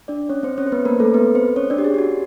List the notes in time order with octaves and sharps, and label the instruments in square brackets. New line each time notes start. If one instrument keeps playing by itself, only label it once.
[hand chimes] D4 D5
C#4 C#5
C4 C5
C#4 C#5
C5
B3 B4
A#3 A#4
A3 A4
B3 B4
C4 C5
C#4 C#5
D4 D5
G4
G#4
G4
F#4